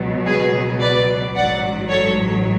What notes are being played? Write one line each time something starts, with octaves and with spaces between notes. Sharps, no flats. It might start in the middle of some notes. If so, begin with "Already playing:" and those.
Already playing: C#2 B2 F#3
G#4 B4
B4 D5
A1 G#2 F#3 D5 F#5
A4 C#5